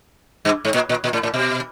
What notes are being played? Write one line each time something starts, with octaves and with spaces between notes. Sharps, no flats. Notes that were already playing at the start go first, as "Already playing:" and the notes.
G2
G#2
A#2
A#2
A#2
A2
A2
B2